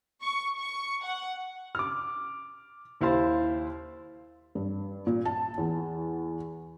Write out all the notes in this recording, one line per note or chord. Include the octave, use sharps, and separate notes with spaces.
C#6
C#6
F#5
D6 F6
D#2 E4 C5 F5 C6 A6
G2
A#2
A5
E2